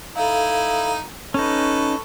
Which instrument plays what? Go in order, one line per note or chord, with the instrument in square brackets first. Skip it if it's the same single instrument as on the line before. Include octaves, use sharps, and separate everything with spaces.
[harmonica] D#4 E4 [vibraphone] A4 F5
[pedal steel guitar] C#4 D#4 [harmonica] A4 B4 [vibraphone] C#6